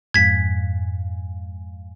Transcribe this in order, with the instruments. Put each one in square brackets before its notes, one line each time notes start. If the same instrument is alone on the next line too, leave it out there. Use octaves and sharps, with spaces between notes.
[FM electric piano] F2 G#2 [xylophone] G#6 B6